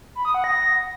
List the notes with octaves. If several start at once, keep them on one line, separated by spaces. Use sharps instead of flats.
B5
D#6
F#5
A#6